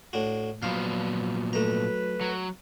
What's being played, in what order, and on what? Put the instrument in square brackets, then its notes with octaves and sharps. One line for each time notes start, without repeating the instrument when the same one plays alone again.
[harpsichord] A2 D4 F#4
[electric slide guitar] A#2 F3 B3 [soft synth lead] F#3 [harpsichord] F5
[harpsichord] A3 A#5 [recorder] B4
[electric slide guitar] F#3